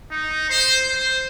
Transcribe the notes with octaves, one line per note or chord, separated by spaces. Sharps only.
D#4
C5
C5